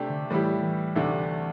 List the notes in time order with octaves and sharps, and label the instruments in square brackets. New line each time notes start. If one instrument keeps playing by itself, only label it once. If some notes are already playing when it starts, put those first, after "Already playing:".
Already playing: [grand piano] C3 A3 D4 G4
[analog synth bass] D3
[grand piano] A2 G3 E4 G4 [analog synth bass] E3
[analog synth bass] E3
[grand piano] D2 C3 A3 D4